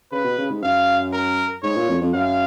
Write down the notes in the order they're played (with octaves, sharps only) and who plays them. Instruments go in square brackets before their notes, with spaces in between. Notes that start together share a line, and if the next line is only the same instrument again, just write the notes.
[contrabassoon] C#3 [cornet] B4
[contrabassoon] B2
C#3
G#2
[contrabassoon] F#2 [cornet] F5
[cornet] A#4
[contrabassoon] G#2 [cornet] C#5
[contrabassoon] A#2
F2
F2
[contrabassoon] F#2 [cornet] F5